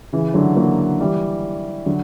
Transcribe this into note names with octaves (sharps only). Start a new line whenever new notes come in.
C#3 E3
D3 F#3
F#3 A#3
E3 G3
D3 F#3